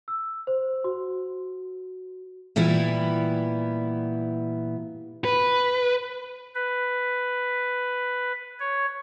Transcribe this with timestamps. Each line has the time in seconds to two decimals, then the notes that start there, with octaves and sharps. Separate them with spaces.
0.08 E6
0.47 C5
0.84 F#4
2.56 A#2 E3 G3 B3 E4
5.25 B4
6.55 B4
8.60 C#5